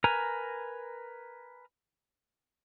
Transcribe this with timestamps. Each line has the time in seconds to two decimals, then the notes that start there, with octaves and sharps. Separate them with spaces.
0.04 A#4 B4 G#5 A#5